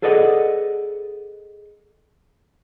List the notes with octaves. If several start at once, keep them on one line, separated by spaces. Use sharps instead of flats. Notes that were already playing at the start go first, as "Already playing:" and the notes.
G#4 A4 B4 D5 D#5 F#5